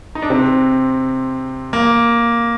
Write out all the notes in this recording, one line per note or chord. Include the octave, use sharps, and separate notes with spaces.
D#4
D4
C3 C4
A#3